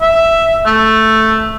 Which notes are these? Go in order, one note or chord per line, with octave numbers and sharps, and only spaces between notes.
E5
A3